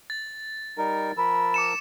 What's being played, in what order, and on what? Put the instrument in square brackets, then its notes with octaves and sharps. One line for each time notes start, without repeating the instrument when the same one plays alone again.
[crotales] A6
[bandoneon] G3 D#4 A#4
[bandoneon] F3 A#4 E6 [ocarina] B5
[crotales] D6 C#7 E7